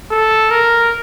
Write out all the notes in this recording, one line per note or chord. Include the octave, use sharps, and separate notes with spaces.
A4
A#4